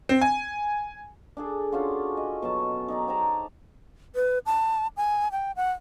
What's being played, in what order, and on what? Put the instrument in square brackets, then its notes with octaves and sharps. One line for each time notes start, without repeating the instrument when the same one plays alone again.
[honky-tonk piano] C4
G#5
[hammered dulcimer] D4 G#4 A4
C#4 D4 F4 F#4
D#5
B2 F#3 A5
D#4 D5 A#5
C5 G5 A5 A#5
[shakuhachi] B4
A5
G#5
G5
F#5